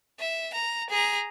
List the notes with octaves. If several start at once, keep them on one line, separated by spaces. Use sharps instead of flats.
E5
A#5
G#4 A#5